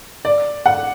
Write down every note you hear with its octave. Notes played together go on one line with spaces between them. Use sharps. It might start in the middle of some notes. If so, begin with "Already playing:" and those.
D5
F#5